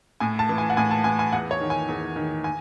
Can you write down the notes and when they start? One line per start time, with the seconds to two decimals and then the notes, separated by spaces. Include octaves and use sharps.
0.20 A2 G#5
0.39 A5
0.49 E3
0.58 G#5
0.70 F#5
0.77 A2 G#5
0.91 A5
1.04 E3 G#5
1.19 G#5
1.32 E2 F#5
1.51 C#5
1.61 D#3
1.70 G#5
1.89 E2
2.16 D#3
2.44 G#5